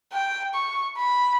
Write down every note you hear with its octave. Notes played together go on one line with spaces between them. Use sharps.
G5
C#6
B5